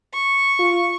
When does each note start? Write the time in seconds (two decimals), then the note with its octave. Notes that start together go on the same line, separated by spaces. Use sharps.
0.14 C#6
0.59 F4